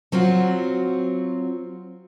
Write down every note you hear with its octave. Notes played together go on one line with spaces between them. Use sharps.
F#3 C4 F4 F#4